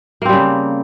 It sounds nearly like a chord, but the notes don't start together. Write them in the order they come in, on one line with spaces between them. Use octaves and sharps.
A#3 C4 G3 C#3